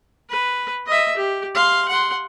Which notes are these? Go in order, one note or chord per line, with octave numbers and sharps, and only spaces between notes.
B4
D#5 E5
G4
F5 C6
F#5 C6